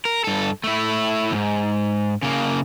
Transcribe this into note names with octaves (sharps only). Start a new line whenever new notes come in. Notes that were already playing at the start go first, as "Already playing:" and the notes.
A#4
G2 A4
A3 E4
D#2 G#2
C#3 A#3